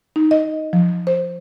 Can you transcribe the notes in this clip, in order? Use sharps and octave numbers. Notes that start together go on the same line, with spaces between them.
D#4
D#5
F3
C5